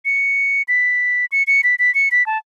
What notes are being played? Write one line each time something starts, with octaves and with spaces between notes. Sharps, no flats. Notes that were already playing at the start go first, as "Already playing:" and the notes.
C#7
B6
C#7
C#7
B6
B6
C#7
B6
A5